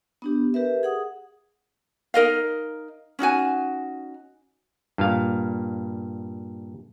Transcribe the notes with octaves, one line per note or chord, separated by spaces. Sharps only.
B3 D4 G4
G4 A#4 B4 E5
G#4 F#5 D#6
D#4 A#4 D#5 F5
C#4 D#4 F#4 G#5
G2 A#2 F5